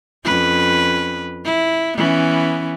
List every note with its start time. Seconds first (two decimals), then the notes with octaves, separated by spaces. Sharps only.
0.24 F2 C#4 B4
1.45 E4
1.97 E3 B3 C#4